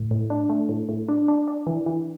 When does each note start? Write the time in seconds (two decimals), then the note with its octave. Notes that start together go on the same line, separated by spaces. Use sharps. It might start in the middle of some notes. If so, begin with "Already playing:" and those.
Already playing: A2 A3
0.11 A2
0.30 D4
0.49 A3
0.69 A2
0.89 A2
1.09 D4
1.28 D4
1.48 D4
1.67 E3
1.86 E3